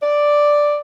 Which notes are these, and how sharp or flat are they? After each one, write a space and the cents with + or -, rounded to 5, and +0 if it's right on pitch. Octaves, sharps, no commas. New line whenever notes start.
D5 +0